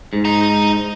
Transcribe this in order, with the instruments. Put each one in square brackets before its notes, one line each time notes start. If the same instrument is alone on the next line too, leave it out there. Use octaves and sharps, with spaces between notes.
[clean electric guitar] G#2
[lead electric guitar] D#5 A#5